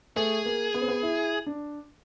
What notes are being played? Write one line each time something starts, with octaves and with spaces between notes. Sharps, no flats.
A3 G#4
A#3
B3
C4
B3
E4
D4